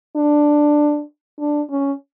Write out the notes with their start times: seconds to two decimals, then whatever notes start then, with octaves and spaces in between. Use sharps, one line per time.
0.16 D4
1.40 D4
1.71 C#4